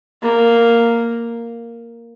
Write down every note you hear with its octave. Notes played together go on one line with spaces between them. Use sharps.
A#3